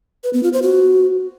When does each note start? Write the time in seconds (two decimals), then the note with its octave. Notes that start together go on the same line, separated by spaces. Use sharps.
0.24 B4
0.33 B3
0.43 F4
0.53 C5
0.63 F#4